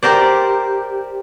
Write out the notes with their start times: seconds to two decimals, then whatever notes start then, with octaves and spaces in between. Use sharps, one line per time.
0.03 G4 A#4 C5 D5